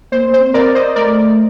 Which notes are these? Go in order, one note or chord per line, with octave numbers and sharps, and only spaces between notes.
A#3 C5
C5
C4
A#4 D5
C5 D#5
A3 A#4 D5